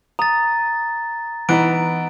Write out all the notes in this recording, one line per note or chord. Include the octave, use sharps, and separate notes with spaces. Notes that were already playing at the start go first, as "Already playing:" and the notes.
A#5 D#6 A6
E3 B3 D#4 B4 D7